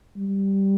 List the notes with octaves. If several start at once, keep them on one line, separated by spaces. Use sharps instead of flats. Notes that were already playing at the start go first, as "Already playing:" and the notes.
G3